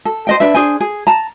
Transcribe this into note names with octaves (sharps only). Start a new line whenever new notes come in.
A4
C5 D#5 G5
D4 B4 E5
D4 G#4 C5 G#5
G#4
A5 A#5